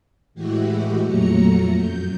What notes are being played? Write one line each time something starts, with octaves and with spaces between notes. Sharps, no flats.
A2 E3 G#3 E4 F#4 G4
F2 A#2 F#3 A3 A#5 C#7
F#2 G6